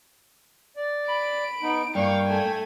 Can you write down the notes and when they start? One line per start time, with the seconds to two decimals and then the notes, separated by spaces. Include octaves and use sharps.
0.76 D5
1.08 B5 D7
1.62 B3 D#4
1.95 G2 A#3 F5 G5 C#6
2.26 A3 G#5